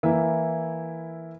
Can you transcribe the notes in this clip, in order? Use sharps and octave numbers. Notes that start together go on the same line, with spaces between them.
E3 A#3 E4